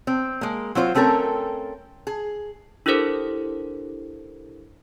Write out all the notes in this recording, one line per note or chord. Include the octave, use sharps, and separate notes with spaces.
C4
G#3 A#3
F#3 C4 F4 C5
A3 C4 C#4 A4 A#4
G#4
D4 E4 G4 A4 A#4 C5